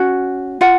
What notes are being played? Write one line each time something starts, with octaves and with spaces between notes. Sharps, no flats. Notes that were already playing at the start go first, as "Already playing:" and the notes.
Already playing: C#4 F#4
F4 F#5